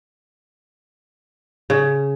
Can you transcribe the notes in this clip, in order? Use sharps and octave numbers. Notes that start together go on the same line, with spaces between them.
C#3